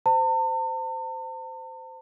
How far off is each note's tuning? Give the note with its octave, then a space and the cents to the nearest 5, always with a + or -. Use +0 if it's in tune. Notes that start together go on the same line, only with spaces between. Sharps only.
C5 -20 A5 +45